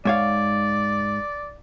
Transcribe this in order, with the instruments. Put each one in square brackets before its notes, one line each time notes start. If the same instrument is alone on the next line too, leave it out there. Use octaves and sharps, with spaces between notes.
[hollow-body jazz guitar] G#2 C#5 F5 [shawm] D5